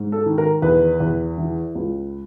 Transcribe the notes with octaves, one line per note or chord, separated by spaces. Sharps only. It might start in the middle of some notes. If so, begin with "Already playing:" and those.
Already playing: G#2
A4
D#3
A#4
E2 B4
E2
E3
C#2